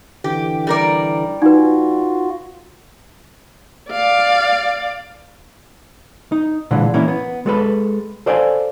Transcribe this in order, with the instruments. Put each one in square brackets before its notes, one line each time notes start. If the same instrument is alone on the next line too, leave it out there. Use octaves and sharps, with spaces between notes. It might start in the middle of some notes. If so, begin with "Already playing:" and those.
[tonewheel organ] D3 E3 [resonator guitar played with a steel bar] G4
[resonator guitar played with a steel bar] G3 A#4 D5
[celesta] D#4 B4 [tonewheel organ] F4 F#4
[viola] D5 F5
[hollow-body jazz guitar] D#4
A#2 D3 E3 G#3
E3 A#3 C#4 E4
B3
G#3 A4 B4
A4 C5 D5 F5 G#5